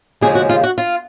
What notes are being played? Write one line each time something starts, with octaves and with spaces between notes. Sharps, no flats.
D#2 C#3 F3 G#3 G#4
F#4
F4
F#4
F4